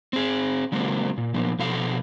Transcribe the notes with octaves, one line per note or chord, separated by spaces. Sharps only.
C4 G#4
C#3 F#3 G#3 A#3 C4
A#2
A#2 F3 B3
B2 F3 A4 F5